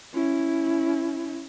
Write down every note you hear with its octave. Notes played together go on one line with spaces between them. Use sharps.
C#4 E4